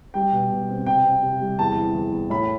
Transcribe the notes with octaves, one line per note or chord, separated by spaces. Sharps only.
G3 G5
B2
B2
C4
C3 G5
C4
C3
G3
E2 A5
E3
E2
E2
A2 B5